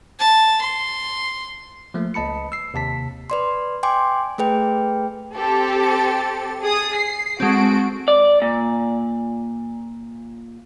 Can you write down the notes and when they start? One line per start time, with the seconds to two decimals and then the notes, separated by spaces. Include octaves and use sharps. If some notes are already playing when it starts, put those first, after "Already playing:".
0.20 A5
0.61 C6
1.94 F3 A3 A#3
2.14 C#2 D#5 A5 B5 C#7
2.52 E6 C7
2.74 D#2 C3 A5 B6
3.30 B4 D5 C6
3.83 G5 G#5 C6 D6
4.38 A3 G#4 B4 G5
5.35 C4 G4 A4
5.83 A6 C#7
6.61 G#4 D#6
6.95 C7
7.40 G#3 C4 F#4 A4 D7
8.08 D5
8.42 A#2